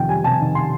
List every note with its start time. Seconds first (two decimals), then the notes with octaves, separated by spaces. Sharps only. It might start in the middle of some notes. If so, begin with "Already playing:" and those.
Already playing: F2 C3 D#3 G5
0.09 G3 G#5
0.24 C3 A5
0.40 D#3
0.55 C6